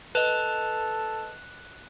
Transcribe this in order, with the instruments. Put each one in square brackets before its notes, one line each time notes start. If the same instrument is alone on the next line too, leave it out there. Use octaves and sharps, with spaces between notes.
[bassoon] A4 [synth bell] B4 D#5 [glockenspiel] F#6 E7 F7